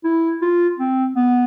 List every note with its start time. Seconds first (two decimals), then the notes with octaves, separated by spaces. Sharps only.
0.04 E4
0.42 F4
0.79 C4
1.16 B3